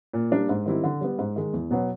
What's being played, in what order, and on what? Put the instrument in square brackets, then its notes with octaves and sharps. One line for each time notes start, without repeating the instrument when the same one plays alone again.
[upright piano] A#2
G3 A#3 D4
G#2
D#3 G3 C4 E4
D3
G3 B3
G#2
D#3 G#3
E2
B2 F#3 B3